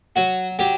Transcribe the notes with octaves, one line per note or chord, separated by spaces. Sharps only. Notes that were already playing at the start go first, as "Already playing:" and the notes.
F#3 F#4
F#3 G4